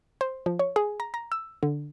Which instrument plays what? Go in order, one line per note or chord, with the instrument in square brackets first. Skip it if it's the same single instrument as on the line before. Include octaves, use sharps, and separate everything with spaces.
[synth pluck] C5
F3
C#5
G#4
A#5
A#5
E6
D3